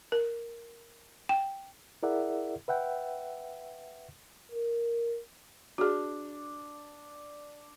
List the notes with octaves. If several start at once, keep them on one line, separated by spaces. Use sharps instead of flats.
A#4
G5
E4 G#4 A#4 D5 E5 F#5
B4 E5 F#5 G5
A#4
D4 F#4 G#4